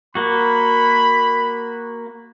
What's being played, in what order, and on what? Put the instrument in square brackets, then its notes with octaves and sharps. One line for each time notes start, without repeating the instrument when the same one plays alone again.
[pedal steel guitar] A#3 F#4 [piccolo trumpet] B5